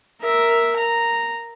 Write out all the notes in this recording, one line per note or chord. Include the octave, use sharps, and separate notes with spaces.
A#4 E5
A#5